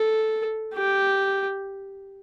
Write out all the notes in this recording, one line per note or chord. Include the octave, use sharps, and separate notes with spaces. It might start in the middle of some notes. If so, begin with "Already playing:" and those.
Already playing: A4
G4